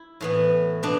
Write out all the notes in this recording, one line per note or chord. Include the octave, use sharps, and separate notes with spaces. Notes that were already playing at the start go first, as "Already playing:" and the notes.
Already playing: E4
A2 E3 B3
B2 B3 D4